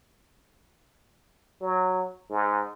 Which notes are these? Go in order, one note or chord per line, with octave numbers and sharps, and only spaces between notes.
F#3
G#2